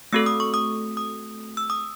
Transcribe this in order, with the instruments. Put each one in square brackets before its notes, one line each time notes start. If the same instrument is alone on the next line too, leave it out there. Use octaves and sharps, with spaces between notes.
[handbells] A3 C4 F#4 A4 E6
D#6
C#6
D#6
D#6
E6
D#6